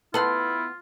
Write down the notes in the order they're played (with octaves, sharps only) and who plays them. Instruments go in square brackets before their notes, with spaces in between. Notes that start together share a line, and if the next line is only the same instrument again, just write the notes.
[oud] B3 [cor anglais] E4 [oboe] F4 [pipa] A4 F#5 C6